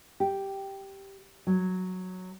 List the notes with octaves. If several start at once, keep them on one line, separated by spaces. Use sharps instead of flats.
G4
F#3